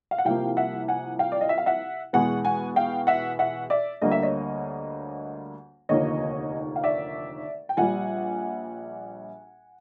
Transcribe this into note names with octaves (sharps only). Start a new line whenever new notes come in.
F5
F#5
C2 C3 F3 A#3 F5 G5
E5 F#5
F#5 G#5
F5 G5
D5
D#5
E5
F5
E5 F#5
E2 B2 G#3 B3 F#5 G#5
F#5 G#5
F5 G5
E5 F#5
E5 F#5
D5 E5
D2 D3 G3 A#3 D#5
E5
C#5 D#5
F1 D#2 D3 F3 A#3 C#5 D#5
F5
D5 E5
G5
A#1 A#2 G3 F#5 G#5